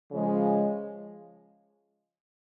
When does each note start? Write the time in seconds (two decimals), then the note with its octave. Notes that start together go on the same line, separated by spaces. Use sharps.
0.11 C#3 F3 G#3